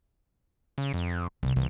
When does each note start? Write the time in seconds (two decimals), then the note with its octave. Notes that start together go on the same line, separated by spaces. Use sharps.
0.78 C#3
0.94 F2
1.43 C2 C3
1.56 C2 E3